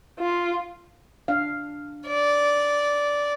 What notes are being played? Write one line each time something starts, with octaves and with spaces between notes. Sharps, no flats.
F4
D4 F5
D5